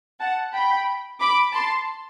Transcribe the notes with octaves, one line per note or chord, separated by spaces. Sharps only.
F#5 A5
G5 B5
B5 D6
A5 C6